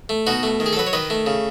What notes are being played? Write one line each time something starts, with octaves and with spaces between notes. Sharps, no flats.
A3
B2 D#4 F#4
A3
D#3
G#4
A4
F#3 B4
C#5
D#3 B4 D#5
A3
C#3